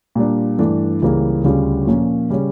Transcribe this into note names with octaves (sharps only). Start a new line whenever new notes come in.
A#2 G3 D4
G2 E3 A3 D4
C#2 C#3 E3 G3 A#3
D2 C#3 G3 C#4 F4
A#2 F3 A#3 C#4 F4
C#3 G3 C#4